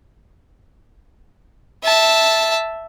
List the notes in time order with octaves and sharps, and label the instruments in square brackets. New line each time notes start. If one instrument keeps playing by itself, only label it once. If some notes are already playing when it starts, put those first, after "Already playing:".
[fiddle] E5 A5